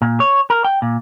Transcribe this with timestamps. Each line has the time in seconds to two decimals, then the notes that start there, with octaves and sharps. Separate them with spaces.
0.02 A#2
0.20 C#5
0.50 A#4
0.64 G5
0.82 A#2